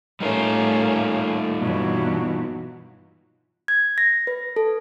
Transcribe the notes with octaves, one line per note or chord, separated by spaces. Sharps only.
A2 G3 A3 A#3 C#4 D#4 F4
G2 B2 E3 F#3
G#6
A#6
B4
A4